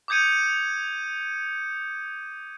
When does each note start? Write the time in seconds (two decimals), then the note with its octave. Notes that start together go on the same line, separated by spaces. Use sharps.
0.08 D6 D#6 G6 G#6 C#7 D#7